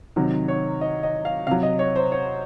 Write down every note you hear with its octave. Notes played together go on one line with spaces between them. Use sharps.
C3 D#3 F#3
C#5
D#5
D#5
F5
C3 F#3 F5
D#5
C#5
C5
C#5